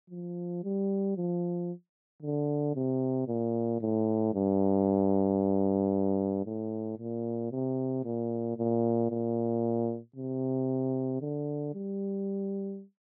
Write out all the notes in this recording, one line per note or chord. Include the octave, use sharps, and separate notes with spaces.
F3
G3
F3
D3
C3
A#2
A2
G2
A2
A#2
C3
A#2
A#2
A#2
C3
D3
G3